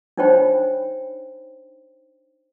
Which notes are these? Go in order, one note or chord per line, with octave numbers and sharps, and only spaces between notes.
D4 D#4 C5 C#5 G5 B5